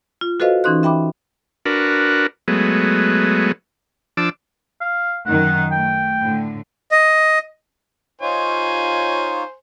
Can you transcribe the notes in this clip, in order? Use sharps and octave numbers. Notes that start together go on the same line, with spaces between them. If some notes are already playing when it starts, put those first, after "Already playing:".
F4
F#4 A4 B4 C5 D#5 F5
E3 C#4 D#4 C6 F#6
E5 G5 B5 D6
D4 F#4 A#4 B4
F#3 G#3 A3 B3
F3 D4 A5 D6 E6
F5
F#2 D#3 D#4 F#5
A3 G5
A2 D3
D#5
D#4 F4 C5 C#5 G#5